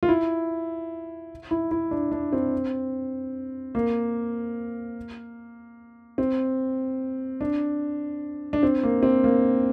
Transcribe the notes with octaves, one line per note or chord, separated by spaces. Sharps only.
F4
E4
E4
E4
D4
D4
C4
A#3
C4
D4
D4
C4
A#3
C4
A#3